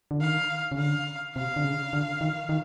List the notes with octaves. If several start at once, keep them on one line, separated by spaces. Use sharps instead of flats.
D3
D#3 F5
C#3
D3 F5
C3 F5
D3
C#3
D3
D#3
D#3